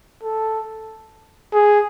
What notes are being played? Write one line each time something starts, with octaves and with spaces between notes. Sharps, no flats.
A4
G#4